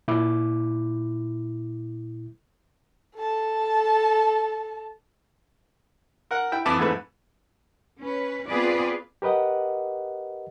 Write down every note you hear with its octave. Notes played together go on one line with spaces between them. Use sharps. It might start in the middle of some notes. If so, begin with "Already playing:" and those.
A#2 E4 D6
A4 A5
A#4 F#5
E4 G5
F2 E3 E4 E5 A5 D6
F2 G#2 E3 A3 B4
C#4 B4
B3 C4 F4 G#4 B4 D5
G4 A#4 B4 D#5 F#5